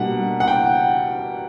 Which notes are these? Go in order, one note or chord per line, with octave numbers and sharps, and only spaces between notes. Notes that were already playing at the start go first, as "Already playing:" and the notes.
Already playing: B2 G3 A#3 D4 F#5
F#5
G5